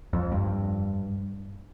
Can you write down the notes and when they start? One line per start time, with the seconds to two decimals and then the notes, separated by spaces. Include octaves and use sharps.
0.13 F2
0.32 G2